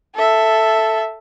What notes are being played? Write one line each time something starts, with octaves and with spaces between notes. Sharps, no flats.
A4 E5